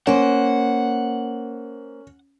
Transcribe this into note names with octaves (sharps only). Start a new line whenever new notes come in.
A#3 C#4 C5 F#5